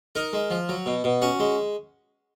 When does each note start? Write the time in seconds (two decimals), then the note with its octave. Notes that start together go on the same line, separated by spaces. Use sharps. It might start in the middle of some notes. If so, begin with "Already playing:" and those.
0.15 D#4 A#4
0.33 G#3
0.50 F3
0.69 F#3
0.86 B2
1.04 B2
1.22 C#4 F#4
1.40 G#3